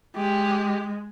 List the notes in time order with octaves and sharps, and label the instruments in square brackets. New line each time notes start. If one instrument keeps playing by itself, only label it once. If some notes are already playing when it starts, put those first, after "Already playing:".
[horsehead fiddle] G#3 [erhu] G4